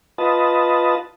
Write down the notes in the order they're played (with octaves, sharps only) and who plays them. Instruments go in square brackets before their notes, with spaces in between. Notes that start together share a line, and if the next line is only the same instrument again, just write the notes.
[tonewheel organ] F4 B4 D#5 A5